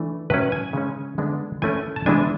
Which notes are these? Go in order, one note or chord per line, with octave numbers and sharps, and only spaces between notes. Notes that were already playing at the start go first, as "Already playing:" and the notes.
Already playing: E3 A3 D4
A2 F#3 C#4 B4
G#5
C#3 G#3 C#4
D3 G#3 B3 D4
E3 A3 C#4 G#5
A5
E3 G#3 B3 D4 G#5